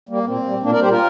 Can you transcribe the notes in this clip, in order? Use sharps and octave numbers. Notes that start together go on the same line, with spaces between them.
G3 A#3
A#2 C4
G3
A#2 A#3 D4
A#4 D5
G3 G4 C5
F4 A#4